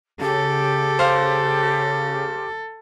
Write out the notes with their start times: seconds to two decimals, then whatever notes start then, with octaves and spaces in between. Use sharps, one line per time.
0.21 C#3 G4 A4
0.99 C5 F5